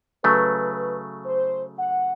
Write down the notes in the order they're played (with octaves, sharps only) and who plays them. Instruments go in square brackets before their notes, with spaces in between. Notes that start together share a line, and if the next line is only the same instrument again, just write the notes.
[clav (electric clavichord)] C#3 F#3 A3 [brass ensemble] B4
[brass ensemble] C5
F#5